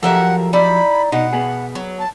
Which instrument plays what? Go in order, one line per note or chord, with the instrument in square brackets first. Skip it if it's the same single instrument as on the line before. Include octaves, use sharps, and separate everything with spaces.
[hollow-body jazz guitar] F3 F#3 G4 [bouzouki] A4 A#4 E5 [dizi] F#5
[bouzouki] D#4 E4 D5 [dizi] B5
[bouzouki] B2 [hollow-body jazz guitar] D#4 [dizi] F#5
[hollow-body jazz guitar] B3 G#4
[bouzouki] F#3
[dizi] A5